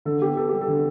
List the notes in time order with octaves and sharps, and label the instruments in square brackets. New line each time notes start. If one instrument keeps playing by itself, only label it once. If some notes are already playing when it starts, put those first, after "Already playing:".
[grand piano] D3 [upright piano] A4
[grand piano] B3 [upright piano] G4
[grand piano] B3 [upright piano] A4
[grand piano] G3 [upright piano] G4
[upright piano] A4
[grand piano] D3